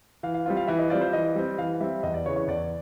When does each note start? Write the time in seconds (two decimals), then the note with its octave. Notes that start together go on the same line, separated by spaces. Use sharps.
0.23 E3 F5
0.34 F5
0.46 G3 C4 F4
0.57 F5
0.67 E3 E5
0.79 D#5
0.90 G3 C4 F4 D5
1.01 C5
1.13 E3 D#5
1.36 G3 C4
1.58 E3 F5
1.80 G3 C4 E5
2.03 E2 D#5
2.14 D5
2.26 C#3 E3 C#5
2.36 C#5
2.47 E2 D5